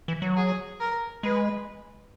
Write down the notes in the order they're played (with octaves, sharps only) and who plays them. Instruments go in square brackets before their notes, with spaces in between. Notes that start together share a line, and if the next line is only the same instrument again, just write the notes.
[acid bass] E3
F#3
[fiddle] G#4
A#4
[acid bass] G#3 [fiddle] B4